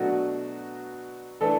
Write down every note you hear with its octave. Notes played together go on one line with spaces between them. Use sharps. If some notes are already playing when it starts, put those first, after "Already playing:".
Already playing: B2 F#3 A3 D4 F#4
E3 A3 D4 A4